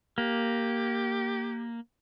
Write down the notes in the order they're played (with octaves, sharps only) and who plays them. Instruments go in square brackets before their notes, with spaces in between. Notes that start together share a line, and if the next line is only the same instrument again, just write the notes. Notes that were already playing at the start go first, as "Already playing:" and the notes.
[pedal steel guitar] A#3 [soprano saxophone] G4